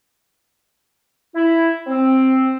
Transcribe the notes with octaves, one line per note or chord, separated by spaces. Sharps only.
E4
C4